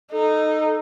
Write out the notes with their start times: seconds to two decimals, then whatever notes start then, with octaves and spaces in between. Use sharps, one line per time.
0.12 D#4 A4